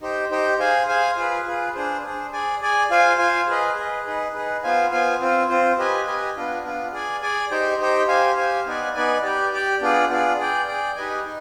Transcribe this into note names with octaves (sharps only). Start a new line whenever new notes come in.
D#4 G4 C5 G5
D#4 G4 C5 G5
G#4 C5 F5 G#5
G#4 C5 F5 G#5
F4 G#4 B4
F4 G#4 B4
D4 G#4 C5
D4 G#4 C5
G#4 D5 G#5
G#4 D5 G#5
F4 C5 F5 G#5
F4 C5 F5 G#5
G#4 B4 D#5
G#4 B4 D#5
D#4 G#4 B4
D#4 G#4 B4
B3 F4 C5 F5 G#5
B3 F4 C5 F5 G#5
C4 F4 C5
C4 F4 C5
G4 B4 D#5 G#5
G4 B4 D#5 G#5
B3 D4 F4
B3 D4 F4
G#4 D5 G#5
G#4 D5 G#5
D#4 G4 C5 G5
D#4 G4 C5 G5
G4 C5 F5 G#5
G4 C5 F5 G#5
B3 D#4 B4 D5 G#5
B3 D#4 B4 D5 G#5
G4 D5 G5
G4 D5 G5
B3 D4 F4 G#4 D5
B3 D4 F4 G#4 D5
G#4 D5 G5
G#4 D5 G5
D#4 G4 B4 D#5 G#5
D#4